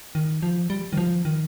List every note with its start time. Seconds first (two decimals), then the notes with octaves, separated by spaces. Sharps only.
0.15 D#3
0.43 F3
0.70 G3
0.93 D#3
0.97 F3
1.25 D#3